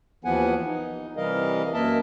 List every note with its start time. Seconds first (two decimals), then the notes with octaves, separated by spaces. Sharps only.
0.25 D#2 E3 F3 B3 F#5 G#5
0.66 D#4
1.17 C3 E3 G3 A#4 D#5 F5
1.73 F#2 A#3 A#4 D#5 E5 A5